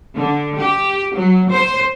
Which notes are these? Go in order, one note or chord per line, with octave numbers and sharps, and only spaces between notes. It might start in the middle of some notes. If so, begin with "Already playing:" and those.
D3
G4
F#3
C5